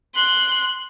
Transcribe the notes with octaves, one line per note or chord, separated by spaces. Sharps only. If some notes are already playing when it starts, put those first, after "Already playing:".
C6 F#6